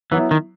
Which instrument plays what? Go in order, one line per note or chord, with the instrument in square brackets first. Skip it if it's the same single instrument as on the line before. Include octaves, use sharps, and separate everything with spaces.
[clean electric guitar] E3 [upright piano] F#3 B3 E4
[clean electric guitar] D#3